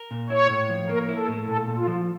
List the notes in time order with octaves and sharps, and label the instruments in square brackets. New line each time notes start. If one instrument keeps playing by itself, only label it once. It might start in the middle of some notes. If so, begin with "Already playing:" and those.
Already playing: [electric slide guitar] A#4
A#2
[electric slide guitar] E4 [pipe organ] C#5
[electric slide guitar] A2
F3
[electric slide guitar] A#3 [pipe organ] A#4
[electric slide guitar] E4
[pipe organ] A4
[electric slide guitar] A2
[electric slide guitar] A#2 [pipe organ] A4
[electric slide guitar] A#2
[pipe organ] F4
[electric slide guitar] F3